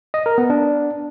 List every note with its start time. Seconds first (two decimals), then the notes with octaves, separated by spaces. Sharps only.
0.14 D#5
0.26 A#4
0.38 B3
0.50 D4